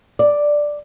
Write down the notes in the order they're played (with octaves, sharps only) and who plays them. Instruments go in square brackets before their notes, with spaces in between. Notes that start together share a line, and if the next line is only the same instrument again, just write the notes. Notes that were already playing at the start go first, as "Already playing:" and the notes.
[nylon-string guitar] D5